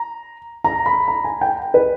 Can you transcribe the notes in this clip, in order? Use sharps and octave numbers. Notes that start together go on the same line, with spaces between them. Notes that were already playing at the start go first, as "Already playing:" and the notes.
Already playing: A#5
A#5
B5
A#5
G#5
G5
B4